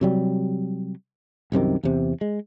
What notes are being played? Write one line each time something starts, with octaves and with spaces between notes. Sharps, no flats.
C3 F#3 G3
C2 F#2 C3 D#3
E2 C3
G#3